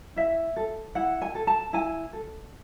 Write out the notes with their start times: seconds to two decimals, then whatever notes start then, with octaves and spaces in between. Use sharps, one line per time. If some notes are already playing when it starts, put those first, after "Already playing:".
0.16 E4 E5
0.56 A4
0.95 E4 F#5
1.22 G#5
1.35 A4
1.47 A5
1.73 E4 G#5
2.13 A4